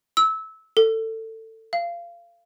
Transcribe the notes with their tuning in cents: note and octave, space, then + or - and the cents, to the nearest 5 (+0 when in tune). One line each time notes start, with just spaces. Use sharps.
E6 -20
A4 +20
F5 -25